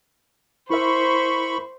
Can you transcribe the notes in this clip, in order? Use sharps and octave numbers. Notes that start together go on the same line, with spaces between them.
E4 A#4 C5 E5 B5 C#6